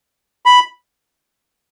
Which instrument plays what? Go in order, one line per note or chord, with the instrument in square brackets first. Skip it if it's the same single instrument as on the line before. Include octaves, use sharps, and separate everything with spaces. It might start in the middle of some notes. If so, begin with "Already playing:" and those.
[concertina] B5